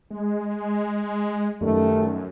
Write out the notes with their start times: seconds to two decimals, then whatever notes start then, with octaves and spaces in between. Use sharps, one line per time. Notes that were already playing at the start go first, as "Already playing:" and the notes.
0.11 G#3
1.61 F#2 D#3 G3 A3